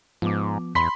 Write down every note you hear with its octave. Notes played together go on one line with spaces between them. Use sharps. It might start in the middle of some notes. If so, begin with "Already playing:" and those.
G#2 F3 B3 D6
E2 B5 C6 B6